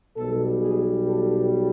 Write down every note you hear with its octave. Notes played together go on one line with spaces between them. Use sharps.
B1 B2 G3 A4
G#4
A4